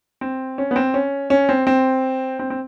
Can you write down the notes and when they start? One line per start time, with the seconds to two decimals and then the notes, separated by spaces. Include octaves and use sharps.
0.21 C4
0.58 C#4
0.71 B3
0.76 C4
0.94 C#4
1.30 C#4
1.49 C4
1.67 C4
2.39 C4
2.50 C4